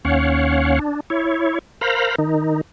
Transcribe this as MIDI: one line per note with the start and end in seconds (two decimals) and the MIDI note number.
0.05 0.79 39
0.05 0.79 61
0.05 0.79 73
0.05 0.79 77
0.05 0.79 78
0.79 1.00 62
1.10 1.59 64
1.10 1.59 73
1.81 2.15 70
1.81 2.15 72
1.81 2.15 77
1.81 2.15 82
1.81 2.15 83
2.19 2.61 51
2.19 2.61 63